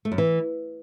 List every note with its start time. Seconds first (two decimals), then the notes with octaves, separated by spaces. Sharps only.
0.05 A3
0.12 F#2
0.18 E3